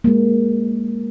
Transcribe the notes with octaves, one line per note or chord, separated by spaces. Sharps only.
G#3 A#3